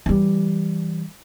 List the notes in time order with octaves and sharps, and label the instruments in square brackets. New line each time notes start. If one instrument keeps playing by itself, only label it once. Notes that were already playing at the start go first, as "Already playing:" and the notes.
[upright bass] E3 G3